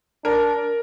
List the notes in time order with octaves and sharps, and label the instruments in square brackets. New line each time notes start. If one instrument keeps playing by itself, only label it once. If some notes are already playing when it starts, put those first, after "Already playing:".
[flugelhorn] D4 [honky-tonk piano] A#4